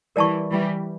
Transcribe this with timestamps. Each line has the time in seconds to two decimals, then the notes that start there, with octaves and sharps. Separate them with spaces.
0.16 E3 G3 A#4 D5 A5 C#6
0.52 E3 G3